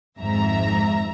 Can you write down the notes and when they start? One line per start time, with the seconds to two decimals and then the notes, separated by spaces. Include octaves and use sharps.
0.19 G#1 F2 G#2 E5 A#5